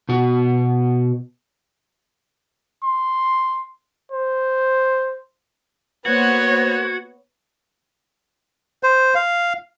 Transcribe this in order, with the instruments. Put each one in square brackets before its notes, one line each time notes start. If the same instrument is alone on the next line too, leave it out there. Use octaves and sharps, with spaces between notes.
[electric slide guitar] B2 F#4
[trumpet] C6
C5
[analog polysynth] A#3 C5 F#6 [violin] B3 C#5 [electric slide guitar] F#4 [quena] G#6
[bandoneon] C5
F5